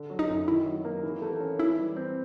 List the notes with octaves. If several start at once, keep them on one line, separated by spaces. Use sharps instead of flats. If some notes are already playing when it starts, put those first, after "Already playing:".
Already playing: D3
F#3
D#4
F#2
D#3 E4
F#3
A#3
E3
A3
C#4
E3 E4
G3
C4